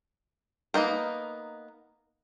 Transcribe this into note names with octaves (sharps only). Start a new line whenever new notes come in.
A#3 B3 D#4 A#4